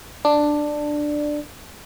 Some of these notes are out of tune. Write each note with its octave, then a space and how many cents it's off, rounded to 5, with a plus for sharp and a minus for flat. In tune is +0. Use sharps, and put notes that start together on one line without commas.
D4 +10